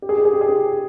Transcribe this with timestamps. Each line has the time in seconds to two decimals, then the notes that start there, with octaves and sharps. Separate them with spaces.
0.02 G4
0.09 G#4
0.18 G4
0.25 G#4
0.33 G4
0.41 G#4
0.49 G4